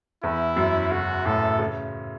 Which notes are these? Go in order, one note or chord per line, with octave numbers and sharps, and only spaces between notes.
E2 E4
F#2
C#3 F#4
A2 A4
C#3